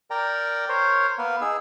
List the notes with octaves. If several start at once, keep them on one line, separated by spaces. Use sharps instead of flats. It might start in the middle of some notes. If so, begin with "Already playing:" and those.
A#4 D5 G5 A#5
A#4 C5 C#5
A#3 B3 A#4 B4
D#4 G#4 E6